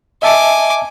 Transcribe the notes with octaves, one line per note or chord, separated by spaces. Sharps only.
D#5 E5 G#5 A5 D6